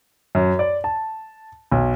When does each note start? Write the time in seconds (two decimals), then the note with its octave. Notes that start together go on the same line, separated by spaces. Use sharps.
0.35 F#2
0.59 D5
0.84 A5
1.72 B1